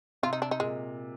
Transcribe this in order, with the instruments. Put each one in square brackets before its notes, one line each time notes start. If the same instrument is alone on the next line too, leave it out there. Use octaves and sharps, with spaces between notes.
[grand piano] C3 [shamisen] F4
[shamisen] D#4
D4
D#4
[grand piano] A#2 [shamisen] G#3